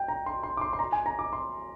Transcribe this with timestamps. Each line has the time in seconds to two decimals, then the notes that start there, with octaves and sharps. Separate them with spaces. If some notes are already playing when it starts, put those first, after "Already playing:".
Already playing: G5
0.08 A#5
0.26 C6
0.43 C6
0.57 D6
0.61 C6
0.73 C6
0.79 A#5
0.92 G#5
1.06 A#5
1.19 D6
1.33 C6